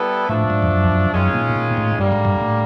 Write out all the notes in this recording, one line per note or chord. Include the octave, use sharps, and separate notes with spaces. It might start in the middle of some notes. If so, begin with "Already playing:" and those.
Already playing: G3 B3 E4 A4
A2 F3 A3 D4
G#2
F2
F#2
F2
F#2
F#2 D#3 G#3 C#4 F4
A#2
A#2
A2
G2 D3 G3 A#3
G#2
G2
A2